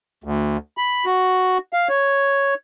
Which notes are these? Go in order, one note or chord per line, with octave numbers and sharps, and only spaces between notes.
D2
B5
F#4
F5
C#5